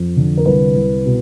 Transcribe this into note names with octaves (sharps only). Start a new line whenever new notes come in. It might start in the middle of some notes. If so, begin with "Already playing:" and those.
Already playing: F2
D3
A#4
C2 B4
C2
B2